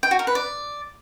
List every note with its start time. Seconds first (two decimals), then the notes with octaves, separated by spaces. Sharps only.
0.03 G5
0.11 F#4
0.19 A#4
0.27 B4
0.35 D5